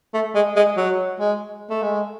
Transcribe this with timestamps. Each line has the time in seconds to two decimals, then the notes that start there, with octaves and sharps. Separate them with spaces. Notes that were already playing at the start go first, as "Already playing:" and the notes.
0.14 A3
0.35 G#3
0.56 G#3
0.77 F#3
1.20 G#3
1.70 A3
1.83 G#3